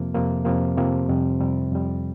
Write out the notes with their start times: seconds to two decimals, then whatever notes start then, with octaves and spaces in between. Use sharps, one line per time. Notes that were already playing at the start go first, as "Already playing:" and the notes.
Already playing: F2 C3 F3 A#3
0.15 F2 C3 F3 A#3
0.45 F2 C3 F3 A#3
0.77 F2 C3 F3 A#3
1.09 F2 C3 G3
1.41 F2 C3 G3
1.72 F2 C3 G3